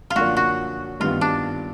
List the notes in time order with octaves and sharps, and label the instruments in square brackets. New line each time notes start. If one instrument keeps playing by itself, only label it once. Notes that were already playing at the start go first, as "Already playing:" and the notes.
[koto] F4
[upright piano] F#2 D3 F3 A#3 D4 [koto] F#4
[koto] F#4
[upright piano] G2 D#3 G3 B3 [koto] F4
[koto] D4